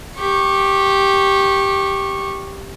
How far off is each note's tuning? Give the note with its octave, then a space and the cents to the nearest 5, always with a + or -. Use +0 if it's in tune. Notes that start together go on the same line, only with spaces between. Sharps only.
G4 +0 C#6 -20